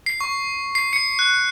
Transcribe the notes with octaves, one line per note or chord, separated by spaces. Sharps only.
C7
C#6
C7
C#7
F#6